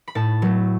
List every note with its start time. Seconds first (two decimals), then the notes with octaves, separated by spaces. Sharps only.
0.08 B5
0.15 A2 A5
0.42 F#3 A3